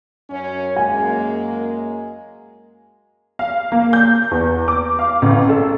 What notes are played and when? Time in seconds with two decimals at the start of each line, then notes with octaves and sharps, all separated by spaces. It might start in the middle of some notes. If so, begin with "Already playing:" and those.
0.30 F#2 C#4
0.76 F#2 G#3 A#3 G#5
3.39 F5
3.72 A#3
3.93 G6
4.31 E2
4.68 D6
4.99 F5
5.22 A1
5.49 A4